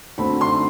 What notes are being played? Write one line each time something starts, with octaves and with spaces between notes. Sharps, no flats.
D2 D3 A3 C4 B5
C6